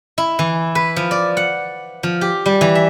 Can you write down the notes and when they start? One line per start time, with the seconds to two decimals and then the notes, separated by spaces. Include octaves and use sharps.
0.18 E4
0.39 E3
0.75 B4
0.96 F3
1.11 D5
1.37 F#5
2.03 F3
2.21 G4
2.46 G3
2.61 E3
2.75 E5